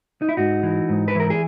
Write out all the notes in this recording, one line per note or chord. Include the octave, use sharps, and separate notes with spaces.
D#4
E4
G#2 D#4 F#4
E3
G#2
B4
E3 A#4
G#4